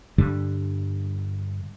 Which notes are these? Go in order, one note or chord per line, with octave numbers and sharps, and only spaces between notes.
G2 D3 G3